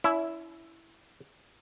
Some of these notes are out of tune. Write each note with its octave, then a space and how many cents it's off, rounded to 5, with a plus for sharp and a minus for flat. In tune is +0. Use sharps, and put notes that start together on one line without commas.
C#4 +40 E4 +0